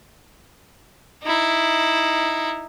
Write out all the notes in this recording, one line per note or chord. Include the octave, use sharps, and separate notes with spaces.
D#4 E4